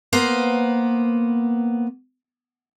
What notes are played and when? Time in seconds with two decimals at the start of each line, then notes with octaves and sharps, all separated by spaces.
0.13 A#3 B3 C5